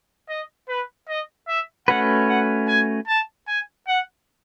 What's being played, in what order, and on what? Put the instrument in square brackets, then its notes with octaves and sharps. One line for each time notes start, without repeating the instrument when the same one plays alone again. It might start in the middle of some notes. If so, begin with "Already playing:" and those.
[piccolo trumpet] D#5
B4
D#5
E5
[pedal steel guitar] A3 C#4 F#4 B4 [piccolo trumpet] F#5
[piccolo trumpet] F#5
G#5
A5
G#5
F#5